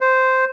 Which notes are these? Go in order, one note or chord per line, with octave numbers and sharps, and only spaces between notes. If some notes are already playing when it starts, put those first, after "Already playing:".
C5